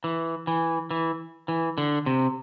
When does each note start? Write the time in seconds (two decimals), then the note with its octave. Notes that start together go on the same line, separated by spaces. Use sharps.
0.04 E3
0.47 E3
0.91 E3
1.48 E3
1.78 D3
2.06 C3